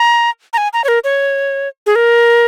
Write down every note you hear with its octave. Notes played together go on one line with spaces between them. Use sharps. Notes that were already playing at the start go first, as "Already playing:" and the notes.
Already playing: A#5
A#5
G#5
A#5
C#5
A#4
C#5
G#4
A#4